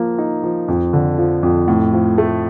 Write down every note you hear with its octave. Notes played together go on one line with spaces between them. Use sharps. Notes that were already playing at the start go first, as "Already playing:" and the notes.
Already playing: F3 A#3
D#4
F3
F2
D3
F3
F2
A2
F3
A3